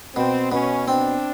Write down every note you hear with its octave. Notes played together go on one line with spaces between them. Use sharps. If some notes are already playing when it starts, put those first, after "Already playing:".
B2 C4
B2 C#4
C4 D4